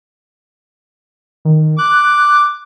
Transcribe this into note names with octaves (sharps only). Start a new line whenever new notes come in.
D#3
D6 F#6